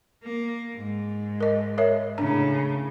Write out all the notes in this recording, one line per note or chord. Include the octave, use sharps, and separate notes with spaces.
A#3
G#2
A#4 D#5
A#4 C#5 E5
A2 C#3 D4 A#5